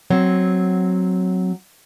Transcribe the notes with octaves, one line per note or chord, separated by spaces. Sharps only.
F#3 C4 C#5